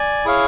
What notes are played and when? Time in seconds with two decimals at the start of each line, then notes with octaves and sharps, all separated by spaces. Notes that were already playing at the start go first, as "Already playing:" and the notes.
Already playing: D5 G#5
0.25 E4 G#4 C#5 F5